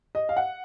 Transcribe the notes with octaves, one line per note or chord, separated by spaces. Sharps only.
D#5
F5
F#5